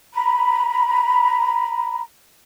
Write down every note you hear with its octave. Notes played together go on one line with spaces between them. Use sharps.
A#5 B5